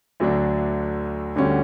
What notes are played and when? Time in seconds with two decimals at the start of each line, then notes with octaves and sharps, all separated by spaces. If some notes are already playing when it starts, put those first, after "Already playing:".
0.20 D2 D3 F#3 A3 D4
1.36 D2 D3 G3 C#4 F#4